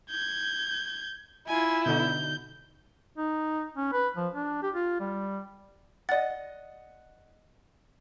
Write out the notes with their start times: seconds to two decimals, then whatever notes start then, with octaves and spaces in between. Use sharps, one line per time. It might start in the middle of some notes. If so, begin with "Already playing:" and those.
0.10 G6 G#6
1.49 E4 F4 G#5
1.86 B2 D3 D#4 G6
3.18 D#4
3.77 C#4
3.93 B4
4.16 F3
4.35 D4
4.63 G4
4.75 F4
5.00 G3
6.09 D5 D#5 F#5 A6